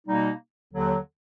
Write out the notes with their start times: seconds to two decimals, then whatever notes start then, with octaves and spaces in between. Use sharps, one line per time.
0.06 B2 G3 A#3 D#4
0.73 D#2 D3 F#3